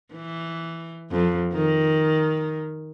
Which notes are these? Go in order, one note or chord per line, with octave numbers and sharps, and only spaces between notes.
E3
F2
D#3